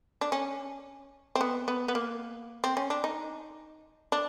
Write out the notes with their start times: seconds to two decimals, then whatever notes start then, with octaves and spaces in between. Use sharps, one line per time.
0.21 D4
0.32 C#4
1.35 C4
1.41 B3
1.68 B3
1.88 B3
1.95 A#3
2.64 C4
2.77 C#4
2.90 D4
3.04 D#4
4.12 D4